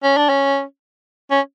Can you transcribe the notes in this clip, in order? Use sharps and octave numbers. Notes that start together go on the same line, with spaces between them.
C#4
D4
C#4
C#4